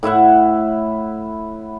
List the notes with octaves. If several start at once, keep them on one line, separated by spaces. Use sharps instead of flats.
A2 E4 E5 F#5